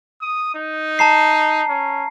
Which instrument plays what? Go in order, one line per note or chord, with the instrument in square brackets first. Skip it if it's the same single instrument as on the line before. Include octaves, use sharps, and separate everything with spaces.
[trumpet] D#6
D#4
[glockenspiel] A5 A#5 C7
[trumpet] C#4